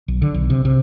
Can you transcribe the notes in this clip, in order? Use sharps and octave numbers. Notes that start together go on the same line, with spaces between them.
B1
D3
B1
C3
C3